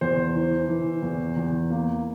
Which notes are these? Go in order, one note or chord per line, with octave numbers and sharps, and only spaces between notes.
E2 C5
E3
E3
E2
E2
A#3